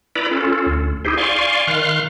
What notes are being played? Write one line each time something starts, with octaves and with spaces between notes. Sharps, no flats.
E4 B4 D5 A#5 B5
C#4 F4 A4
D2
D#4 E4 G4 G#4 C5
D5 F5 G#5 C6 C#6
D#3 F5 C6 F6 F#6